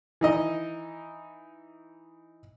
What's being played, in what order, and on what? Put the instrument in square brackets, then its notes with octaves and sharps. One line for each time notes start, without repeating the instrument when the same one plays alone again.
[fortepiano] E3 D#4 D#5